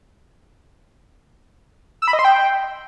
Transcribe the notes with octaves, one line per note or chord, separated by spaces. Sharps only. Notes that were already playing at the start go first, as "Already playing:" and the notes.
E6
B5
D#5
C6
G5